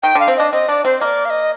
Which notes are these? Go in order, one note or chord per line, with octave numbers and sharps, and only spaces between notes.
D#3 G5
D3 F5
C4
D4 D#5
C4 D#5
D4 D5
C4 C5
A#3 D5 D#5
F5
D#5